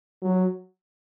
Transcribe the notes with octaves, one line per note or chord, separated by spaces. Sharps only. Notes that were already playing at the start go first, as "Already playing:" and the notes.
F#3